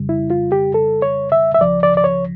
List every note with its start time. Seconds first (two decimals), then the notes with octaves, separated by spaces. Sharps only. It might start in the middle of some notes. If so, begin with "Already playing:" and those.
Already playing: F2 C#3 G3
0.09 E4
0.30 F4
0.52 G4
0.74 A4
1.02 C#5
1.32 E5
1.55 E5
1.61 C#2 C#3 F3 D5
1.83 D5
1.97 D5
2.04 C#5